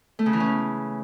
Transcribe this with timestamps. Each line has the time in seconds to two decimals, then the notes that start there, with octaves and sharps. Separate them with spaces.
0.19 A3
0.26 C#3
0.33 E3
0.40 C#4